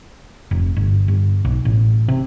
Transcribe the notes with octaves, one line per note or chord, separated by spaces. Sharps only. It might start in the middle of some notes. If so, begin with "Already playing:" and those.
F1
G1
G1
B1
A1
C3